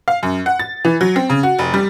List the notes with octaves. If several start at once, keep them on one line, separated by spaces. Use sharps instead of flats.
F5
F#2
F#5
A6
E3
F#3
C4
C#3
F#4
F1
G3